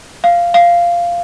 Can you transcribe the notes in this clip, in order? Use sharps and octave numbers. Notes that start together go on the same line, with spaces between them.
F5
F5